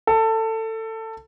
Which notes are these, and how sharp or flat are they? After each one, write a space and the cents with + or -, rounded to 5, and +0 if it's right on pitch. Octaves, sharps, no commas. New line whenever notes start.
A4 +20